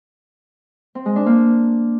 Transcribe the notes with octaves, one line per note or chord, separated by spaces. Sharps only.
C4
G#3
D4
A#3